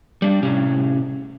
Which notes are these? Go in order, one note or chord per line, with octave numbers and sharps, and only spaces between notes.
G3 D4
A2 C3 C#4